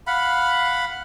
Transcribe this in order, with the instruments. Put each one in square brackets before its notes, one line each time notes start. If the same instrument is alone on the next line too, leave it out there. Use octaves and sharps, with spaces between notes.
[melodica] F5 F#5 B5